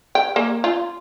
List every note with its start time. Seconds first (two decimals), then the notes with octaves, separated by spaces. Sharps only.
0.15 G5
0.36 A#3
0.64 F4